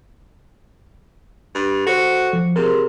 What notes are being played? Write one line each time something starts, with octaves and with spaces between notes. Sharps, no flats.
G2
F#4 A4 C5
F3
C3 G#4 A#4